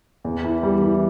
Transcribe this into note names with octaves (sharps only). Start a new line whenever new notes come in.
E2
E3
G3
E3